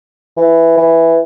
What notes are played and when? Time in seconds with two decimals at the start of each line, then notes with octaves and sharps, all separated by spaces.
0.37 E3
0.77 E3